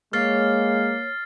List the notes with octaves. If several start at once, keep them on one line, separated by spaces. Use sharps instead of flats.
G#3 A#3 C#5 F6 A6 C7